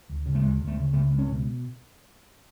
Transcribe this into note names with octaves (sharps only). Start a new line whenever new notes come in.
D2
C#3
A3
D2 G#3
D2
A3
C#3
C#2 A3
C#2
C#4
B2